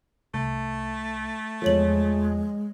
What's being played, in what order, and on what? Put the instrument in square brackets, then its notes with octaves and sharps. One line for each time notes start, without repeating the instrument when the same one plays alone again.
[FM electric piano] C2 [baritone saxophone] A3
[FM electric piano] E2 F3 [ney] G#3 [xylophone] A4 C#5 F#7